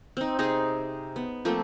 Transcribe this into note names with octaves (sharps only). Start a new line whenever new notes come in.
C4 D#4
C3 D#4 G#4
B3
F3 A3 A#3 C4